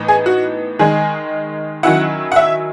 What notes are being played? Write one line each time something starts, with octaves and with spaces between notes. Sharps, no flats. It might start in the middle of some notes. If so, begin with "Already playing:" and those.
Already playing: A2 E3 B3 D#4
G#4
F#4
D#3 G#3 D#4 G#4
D#3 F#3 C#4 E4 F#5
F#5
E5